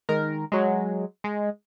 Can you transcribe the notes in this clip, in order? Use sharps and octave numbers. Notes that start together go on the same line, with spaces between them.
D#3 G#3 A#4
F#3 G#3
G#3